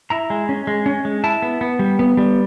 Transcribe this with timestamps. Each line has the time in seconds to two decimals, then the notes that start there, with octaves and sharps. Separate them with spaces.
0.10 E4 A#5
0.30 G#3
0.49 C#4
0.67 G#3
0.86 C#4
1.05 G#3
1.24 E4 A5
1.42 B3
1.61 B3
1.79 G3
1.99 B3
2.17 G3